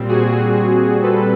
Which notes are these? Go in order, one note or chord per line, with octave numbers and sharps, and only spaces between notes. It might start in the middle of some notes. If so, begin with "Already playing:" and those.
Already playing: A#2 G3 C4
F#4 G#4
A4 B4